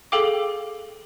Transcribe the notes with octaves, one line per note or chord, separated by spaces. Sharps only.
G#4 A4 F5 G5 D6